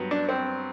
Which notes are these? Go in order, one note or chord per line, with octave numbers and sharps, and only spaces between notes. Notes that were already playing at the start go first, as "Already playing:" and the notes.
Already playing: G2 F#3 B3
D4
C4